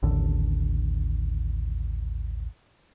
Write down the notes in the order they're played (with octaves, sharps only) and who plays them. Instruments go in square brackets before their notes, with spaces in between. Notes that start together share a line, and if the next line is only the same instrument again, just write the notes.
[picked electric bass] A1 D#2 D3